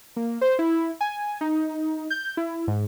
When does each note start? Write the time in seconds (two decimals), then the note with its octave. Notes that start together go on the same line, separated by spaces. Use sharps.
0.17 A#3
0.41 C5
0.59 E4
1.01 G#5
1.41 D#4
2.10 G6
2.37 E4
2.68 G#2